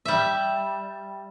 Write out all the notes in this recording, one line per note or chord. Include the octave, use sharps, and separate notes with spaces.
G3 E5